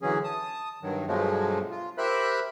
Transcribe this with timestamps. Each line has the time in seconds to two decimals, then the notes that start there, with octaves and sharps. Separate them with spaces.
0.02 D3 E3 F#3 C#4 G#4
0.24 A5 D#6
0.82 G2 D#3 F#3
1.07 G2 B2 F3 F#3 G#3 A3
1.71 F4
1.98 G4 A#4 C5 E5 B5 F#6